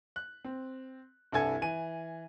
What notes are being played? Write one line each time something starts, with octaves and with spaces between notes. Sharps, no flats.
F#6
C4
C2 G2 E4 A4 G#5 G#6
E3 G#5 D#7